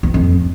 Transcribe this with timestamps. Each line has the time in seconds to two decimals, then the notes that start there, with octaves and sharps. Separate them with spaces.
0.03 E2
0.14 F2